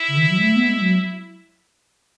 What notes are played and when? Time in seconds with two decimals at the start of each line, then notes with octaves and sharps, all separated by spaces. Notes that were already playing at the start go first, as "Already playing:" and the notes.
Already playing: E4
0.09 C#3
0.17 D#3
0.30 F#3
0.38 G#3
0.42 A3
0.56 B3
0.69 G#3
0.81 F#3